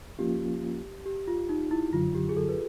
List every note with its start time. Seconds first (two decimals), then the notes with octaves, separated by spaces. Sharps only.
0.19 F3 A#3 C#4 F4 G4
1.06 G4
1.28 F4
1.49 D#4
1.71 E4
1.93 F#2 D3 F#3 F4
2.15 G4
2.29 G#4
2.37 A4
2.49 B4